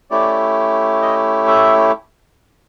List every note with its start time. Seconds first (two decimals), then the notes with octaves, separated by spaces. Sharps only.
0.10 A3 C#4 E4 G4 D5
1.02 D#5
1.47 E5